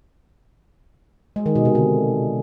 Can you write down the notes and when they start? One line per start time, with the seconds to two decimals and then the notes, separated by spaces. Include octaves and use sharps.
1.36 G#3
1.46 D#3
1.55 B2
1.65 C3
1.75 D3